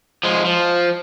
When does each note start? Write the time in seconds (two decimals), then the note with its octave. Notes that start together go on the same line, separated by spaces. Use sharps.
0.23 F3 G#3
0.45 F3